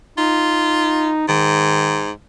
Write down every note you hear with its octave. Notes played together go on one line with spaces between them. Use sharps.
D#4 F4
G#2 D#3